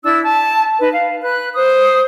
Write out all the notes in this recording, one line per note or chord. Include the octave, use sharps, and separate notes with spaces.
D4 E4 E6
A5
D#4 B4
F5
B4 F#6
C5 D#6